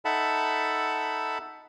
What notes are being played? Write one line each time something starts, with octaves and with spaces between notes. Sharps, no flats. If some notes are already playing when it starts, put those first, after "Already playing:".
D#4 A4 E5 F#5 A5 B5